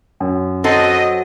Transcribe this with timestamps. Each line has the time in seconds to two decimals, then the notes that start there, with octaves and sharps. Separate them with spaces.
0.20 F#2
0.64 F#3 C4 A4 D#5